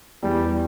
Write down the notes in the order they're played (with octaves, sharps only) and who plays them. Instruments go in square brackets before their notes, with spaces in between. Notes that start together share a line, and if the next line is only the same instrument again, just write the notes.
[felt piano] E2 [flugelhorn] G3